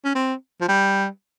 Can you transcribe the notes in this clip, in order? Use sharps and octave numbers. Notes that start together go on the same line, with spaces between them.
C#4
C4
F3
G3